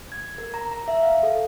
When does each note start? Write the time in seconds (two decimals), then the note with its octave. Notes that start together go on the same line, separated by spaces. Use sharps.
0.12 G#6
0.38 A#4
0.54 A#5
0.72 A#5
0.88 E5
1.02 F5
1.23 A4